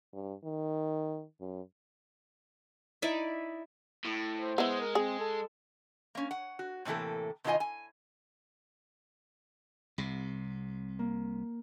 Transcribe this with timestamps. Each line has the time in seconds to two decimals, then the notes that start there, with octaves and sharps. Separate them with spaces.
0.13 G2
0.44 D#3
1.40 F#2
3.02 D#4 E4 D5 E5
4.05 A2
4.36 C5
4.58 G#3 B3 E4
4.80 A#4
4.95 C4 G#4
5.20 A4
6.15 A#3 C#4
6.31 F#5
6.59 F#4
6.85 A2 C3 E3 A#3 A4
7.44 B2 D#3 E4 F4 D#5 G#5
7.60 G#5
9.98 C2 C3
10.99 A#3